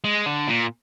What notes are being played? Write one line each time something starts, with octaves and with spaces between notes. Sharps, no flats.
G#3
D3
A#2